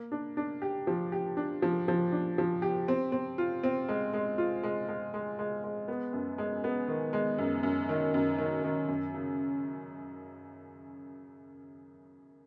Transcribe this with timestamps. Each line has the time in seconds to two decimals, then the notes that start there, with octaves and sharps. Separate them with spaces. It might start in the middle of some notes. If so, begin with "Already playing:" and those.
Already playing: A#3
0.12 D4
0.37 D4
0.62 G4
0.87 F3
1.12 G4
1.37 D4
1.62 F3
1.88 F3
2.12 D4
2.38 F3
2.62 G4
2.88 C4
3.12 C4
3.38 F4
3.63 C4
3.88 G#3
4.13 G#3
4.38 F4
4.63 G#3
4.88 G#3
5.14 G#3
5.39 G#3
5.64 G#3
5.88 B3
6.13 F#2
6.38 G#3
6.64 B3
6.88 D#3
7.13 G#3
7.38 F#2
7.63 F#2
7.89 D#3
8.14 F#2
8.38 D#3
8.63 D#3
8.88 F#2
9.14 C#3